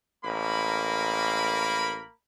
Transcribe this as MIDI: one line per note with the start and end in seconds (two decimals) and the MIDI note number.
0.25 2.02 33
0.25 2.14 58
0.25 2.14 70
0.25 2.14 83